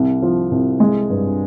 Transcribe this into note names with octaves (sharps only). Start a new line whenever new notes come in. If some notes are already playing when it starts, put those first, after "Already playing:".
Already playing: C2
F3
C2
G#3
G2